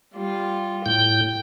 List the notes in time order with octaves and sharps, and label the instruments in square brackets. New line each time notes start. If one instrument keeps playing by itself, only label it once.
[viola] G3 F4
[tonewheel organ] A2 G6 [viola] G5